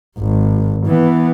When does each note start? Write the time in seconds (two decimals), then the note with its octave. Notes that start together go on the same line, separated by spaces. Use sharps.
0.18 G#1
0.86 E3 B3